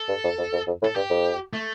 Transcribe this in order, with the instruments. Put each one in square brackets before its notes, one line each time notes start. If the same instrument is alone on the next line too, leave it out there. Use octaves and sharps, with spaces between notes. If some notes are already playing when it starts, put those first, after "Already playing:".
Already playing: [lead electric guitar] A4
[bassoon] G2
F2
F2
F2
F2
A2
[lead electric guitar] A4
[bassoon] G2 [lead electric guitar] G4
[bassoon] F2
[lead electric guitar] A3